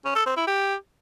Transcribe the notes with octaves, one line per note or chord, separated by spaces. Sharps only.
C#4
A4
C4
E4
G4